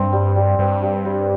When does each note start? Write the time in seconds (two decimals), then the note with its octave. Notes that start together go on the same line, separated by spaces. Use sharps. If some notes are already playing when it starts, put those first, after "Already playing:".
Already playing: G2 C4
0.13 G3
0.36 G3
0.59 G2 C4
0.82 G3
1.05 G3